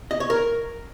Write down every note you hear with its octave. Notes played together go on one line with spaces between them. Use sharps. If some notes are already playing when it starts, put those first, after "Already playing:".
D#5
C#5
A#4